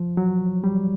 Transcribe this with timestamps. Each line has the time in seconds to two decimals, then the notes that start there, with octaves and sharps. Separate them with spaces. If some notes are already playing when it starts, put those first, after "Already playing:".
Already playing: F3
0.17 F#3
0.64 G3